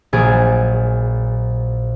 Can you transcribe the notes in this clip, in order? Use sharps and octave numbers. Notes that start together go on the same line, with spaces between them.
A#1 F#3 G#4 G#5 A6 D7